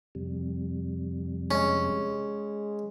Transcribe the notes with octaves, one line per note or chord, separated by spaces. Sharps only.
F2 C3 G3
G#3 C#4